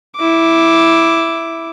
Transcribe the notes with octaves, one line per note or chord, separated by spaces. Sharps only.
E4 D6